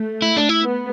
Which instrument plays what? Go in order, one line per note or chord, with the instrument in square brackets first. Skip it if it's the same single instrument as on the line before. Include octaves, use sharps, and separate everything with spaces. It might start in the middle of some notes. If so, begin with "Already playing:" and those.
Already playing: [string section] A3
[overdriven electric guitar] E4
D4
E4
[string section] B3